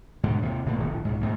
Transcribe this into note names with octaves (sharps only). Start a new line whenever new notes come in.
G#2 B2 D3
D#2 C3
G#1 B2 A3 A#3
D1 A#1 D#3
B1 G#2
D2 G#2 A3